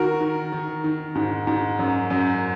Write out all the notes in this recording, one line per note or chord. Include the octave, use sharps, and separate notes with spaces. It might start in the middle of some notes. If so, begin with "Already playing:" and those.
Already playing: D#3 F#4 A#4
D#3
D#3
D#3
G#2
G#2
F#2
F#2